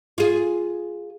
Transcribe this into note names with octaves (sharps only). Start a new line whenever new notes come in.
F4 G#4